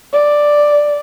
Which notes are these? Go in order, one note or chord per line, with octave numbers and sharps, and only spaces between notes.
D5